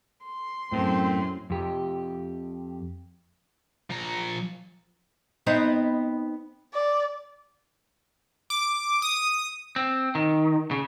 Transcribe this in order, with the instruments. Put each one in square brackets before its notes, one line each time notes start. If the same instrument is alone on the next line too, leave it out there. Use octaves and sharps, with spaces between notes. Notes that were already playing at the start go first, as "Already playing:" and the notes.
[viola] C6
[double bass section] F#2 [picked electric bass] A2 [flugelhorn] C4
[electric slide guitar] F2 G4
[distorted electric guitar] F3 A#5
[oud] B3 C4 D#4
[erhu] D5
[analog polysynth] D6
D#6
[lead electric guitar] C4
D#3
C#3